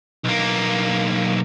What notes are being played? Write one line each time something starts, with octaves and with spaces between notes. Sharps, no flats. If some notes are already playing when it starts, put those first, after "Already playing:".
B1 A#3